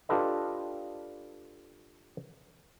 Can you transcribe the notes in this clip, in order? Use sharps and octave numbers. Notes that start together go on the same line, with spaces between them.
D4 F4 G4 A4 B4 D#5